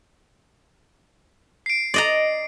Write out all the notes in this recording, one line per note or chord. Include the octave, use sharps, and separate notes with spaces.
C7 D7
D5 D#5 A#5